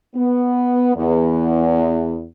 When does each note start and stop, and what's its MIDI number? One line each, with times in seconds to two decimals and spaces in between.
0.16 0.94 59
0.96 2.27 40